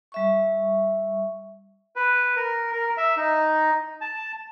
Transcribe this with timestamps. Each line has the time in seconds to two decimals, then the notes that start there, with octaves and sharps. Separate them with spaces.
0.12 G3 E5 C#6
1.96 B4
2.36 A#4
2.73 A#4
2.97 E5
3.17 D#4
4.01 A5